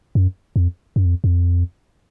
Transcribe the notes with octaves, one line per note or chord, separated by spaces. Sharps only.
F#2
F2
F#2
F2
F2